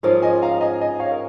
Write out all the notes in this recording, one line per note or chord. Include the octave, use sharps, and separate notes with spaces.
G#2 F3 C#4 F4 A#4
D#5 G#5
F5 A#5
D#5 G#5
D#5 G#5
C#5 F5
A#4